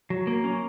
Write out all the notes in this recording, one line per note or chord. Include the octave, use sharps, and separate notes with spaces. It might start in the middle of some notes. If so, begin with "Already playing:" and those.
F#3
A#3
C#4